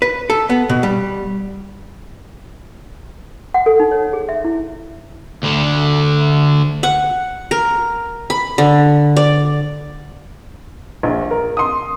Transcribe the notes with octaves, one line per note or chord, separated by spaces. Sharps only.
B4
A4
B3
B2
G3
F#5
A4
D#4
C#5
G#4
E5
E4
D2 D3
F#5
A#4
B5
D3
D5
A#1
A#4
C6 D#6